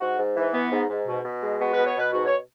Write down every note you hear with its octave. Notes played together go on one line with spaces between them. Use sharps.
G#2 F#4
G#2
E3
B3
G#2
G#2
B2
B2
G#3
B3 F#4
B2 B4
C#5
B2 B4
G#2 F#4
C#5